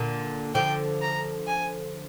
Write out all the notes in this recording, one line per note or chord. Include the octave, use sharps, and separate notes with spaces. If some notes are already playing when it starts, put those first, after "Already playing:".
Already playing: A#2 D3
D3 F3 G5
A#5
G#5